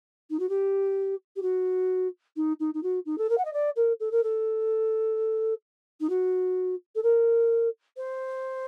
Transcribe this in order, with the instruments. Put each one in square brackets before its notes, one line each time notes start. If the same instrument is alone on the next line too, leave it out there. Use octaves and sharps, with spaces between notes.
[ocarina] D#4
F#4
G4
G4
F#4
D#4
D#4
D#4
F#4
D#4
A4
A#4
F#5
D#5
D5
A#4
A4
A#4
A4
D#4
F#4
A4
A#4
C5